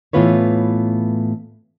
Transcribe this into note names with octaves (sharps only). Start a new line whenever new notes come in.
A2 E3 B3 F4 B4 C#5